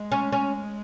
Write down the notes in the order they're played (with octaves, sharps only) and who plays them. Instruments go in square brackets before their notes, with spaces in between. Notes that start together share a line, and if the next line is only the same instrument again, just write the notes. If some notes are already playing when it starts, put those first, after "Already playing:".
Already playing: [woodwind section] G#3
[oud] C#4
C#4